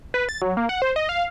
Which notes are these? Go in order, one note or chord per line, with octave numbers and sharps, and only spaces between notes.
B4
A6
F#3
A#3
F#5
C5
D#5
F5